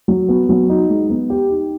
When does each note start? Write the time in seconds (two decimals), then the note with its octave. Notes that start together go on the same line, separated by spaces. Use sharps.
0.08 F#3
0.29 B3
0.49 F#3
0.69 D#4
0.89 G#3
1.10 B3
1.30 G4
1.50 D#4